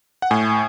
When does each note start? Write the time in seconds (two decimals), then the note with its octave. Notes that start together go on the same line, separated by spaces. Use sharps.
0.22 F#5
0.31 A2 G#5